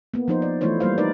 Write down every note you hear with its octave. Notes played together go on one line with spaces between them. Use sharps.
A#3 B3
F3 D#4 C5
D5
E3 A3 E4 F4 C5 C#5
G3 A#3 C5 F5
D#4 A#4 B4 D5